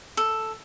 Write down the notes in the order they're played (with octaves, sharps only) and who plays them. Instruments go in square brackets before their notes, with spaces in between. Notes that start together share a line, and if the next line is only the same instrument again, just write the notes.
[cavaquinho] A4